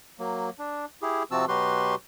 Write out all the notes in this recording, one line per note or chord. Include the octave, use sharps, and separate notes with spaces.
F#3 A#3
D4
E4 G4 G#4
C3 F3 C4 F#4 A5 E6
B2 F#3 F#4 G4 B4 C6